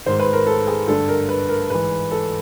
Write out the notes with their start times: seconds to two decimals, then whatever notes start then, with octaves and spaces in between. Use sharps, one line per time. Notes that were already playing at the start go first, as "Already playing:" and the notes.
0.06 G#2 D#3 C5
0.19 B4
0.33 A#4
0.47 A4
0.67 G#4
0.88 G2 D3 A4
1.08 A#4
1.29 B4
1.49 A#4
1.70 G#2 E3 B4
2.11 A4